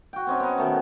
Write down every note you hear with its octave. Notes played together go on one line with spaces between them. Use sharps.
F#4 G5
C4 C#4 D#4
B3 D#4
B2 D#3 A3